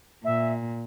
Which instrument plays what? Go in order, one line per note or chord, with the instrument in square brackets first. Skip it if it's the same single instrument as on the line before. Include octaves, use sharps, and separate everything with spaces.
[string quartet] A#2 [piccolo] E5